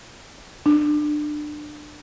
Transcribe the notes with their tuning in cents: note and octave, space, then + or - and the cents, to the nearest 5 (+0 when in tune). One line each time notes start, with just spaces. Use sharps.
D4 +30